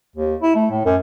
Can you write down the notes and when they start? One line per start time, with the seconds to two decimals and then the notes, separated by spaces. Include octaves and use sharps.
0.16 D#2
0.42 E4
0.55 A3
0.70 A2
0.85 F#2